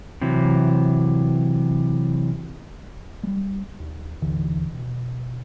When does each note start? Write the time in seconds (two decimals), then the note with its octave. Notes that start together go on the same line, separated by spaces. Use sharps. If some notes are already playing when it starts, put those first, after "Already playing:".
0.21 C3 E3 F#3
3.23 G3 G#3
3.79 D#2
4.22 A1 D#2 D3 E3
4.73 B2